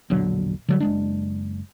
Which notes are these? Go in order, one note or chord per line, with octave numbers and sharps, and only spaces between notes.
E1 A#1 D3 F#3
D3 F#3 G3
F#1 G#3 D4